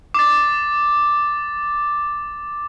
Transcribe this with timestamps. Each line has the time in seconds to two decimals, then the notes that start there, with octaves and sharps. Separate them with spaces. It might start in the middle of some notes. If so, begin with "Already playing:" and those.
0.14 D6 A6